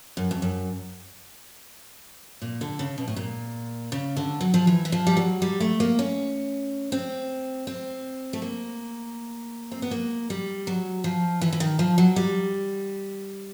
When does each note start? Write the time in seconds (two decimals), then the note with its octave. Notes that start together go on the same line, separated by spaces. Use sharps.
0.17 F#2
0.31 F2
0.42 F#2
2.42 A#2
2.61 D3
2.79 C#3
2.98 B2
3.08 A2
3.16 A#2
3.92 C#3
4.17 D3
4.41 F#3
4.54 F3
4.67 E3
4.85 E3
4.92 F3
5.07 G3
5.17 F#3
5.42 G3
5.60 A3
5.80 A#3
5.99 C#4
6.92 C4
7.67 C4
8.33 A3
8.42 A#3
9.72 C4
9.82 B3
9.91 A#3
10.30 G3
10.67 F#3
11.04 F3
11.41 E3
11.53 E3
11.60 D#3
11.79 F3
11.98 F#3
12.16 G3